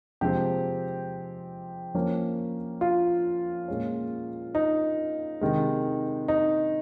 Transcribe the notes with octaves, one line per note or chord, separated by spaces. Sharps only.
C3 F3 G#3 C4 G4
F3 A#3 C#4
F4
A#2 G#3 C#4
D#4
C3 D#3 G#3
D#4